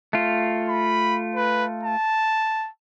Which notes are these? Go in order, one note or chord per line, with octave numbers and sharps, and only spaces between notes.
A3 F4
B5
B4
A5